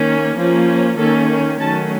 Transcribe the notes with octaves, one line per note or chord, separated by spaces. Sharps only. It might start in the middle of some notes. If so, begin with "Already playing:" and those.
Already playing: D#3 A#3 C#4
F3 A#3 C#4
D#3 A#3 C#4 A4
D#3 F#3 A3 C#4 A5